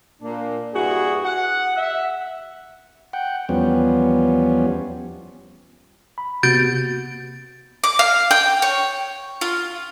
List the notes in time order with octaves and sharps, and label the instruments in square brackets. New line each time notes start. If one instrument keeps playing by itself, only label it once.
[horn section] A#2 A#3 D4
G2 E4 F#4 G#4
F#5
E5
[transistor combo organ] F#5 G5
E2 F3 G3 B3 C#4
[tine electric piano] B5
[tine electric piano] C3 A#3 B3 [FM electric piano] F#4 [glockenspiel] G6 A6 D7
[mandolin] D6
F5
G5
C#5
F4